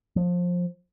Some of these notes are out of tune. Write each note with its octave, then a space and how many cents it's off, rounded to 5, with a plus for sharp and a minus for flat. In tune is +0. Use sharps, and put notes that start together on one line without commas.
F3 +20